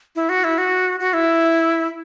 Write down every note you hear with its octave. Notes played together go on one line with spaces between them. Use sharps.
E4
F#4
E4
F#4
F#4
E4